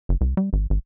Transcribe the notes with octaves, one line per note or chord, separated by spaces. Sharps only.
F#1
C2
G3
G#1
G#1